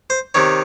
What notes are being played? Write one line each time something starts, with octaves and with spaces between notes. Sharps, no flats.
C5
C3 D#3 C#5